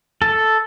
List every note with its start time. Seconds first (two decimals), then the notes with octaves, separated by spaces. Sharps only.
0.22 A4